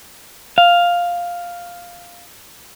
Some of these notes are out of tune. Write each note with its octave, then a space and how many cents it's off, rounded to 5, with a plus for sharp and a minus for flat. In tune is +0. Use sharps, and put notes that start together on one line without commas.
F5 +5